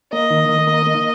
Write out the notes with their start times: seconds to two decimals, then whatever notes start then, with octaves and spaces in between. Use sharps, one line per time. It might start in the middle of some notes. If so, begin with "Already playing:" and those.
0.13 A#3 D#5
0.30 D#3
0.49 D#3
0.67 A#3
0.86 A#3